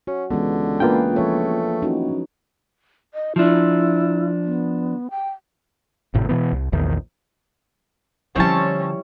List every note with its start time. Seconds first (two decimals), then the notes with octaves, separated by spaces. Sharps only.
0.07 C#4 F#4
0.31 C#2 D3 E3 G#3 B3
0.80 A#3 D4 F4 G#4 B4 G5
1.16 F3 A3 C#5
1.82 F#2 D#4 E4 F#4
3.14 D#5
3.36 F3 D4 E4
4.44 B3
5.10 G5
6.14 G#1 A2 C3
6.29 B2 E3 B3
6.53 C2
6.73 A#1 E2 D#3
8.36 D3 F3 G3 C4 C#4 E4 C#5 A5